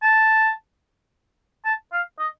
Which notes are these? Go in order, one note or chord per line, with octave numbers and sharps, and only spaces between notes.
A5
A5
F5
D#5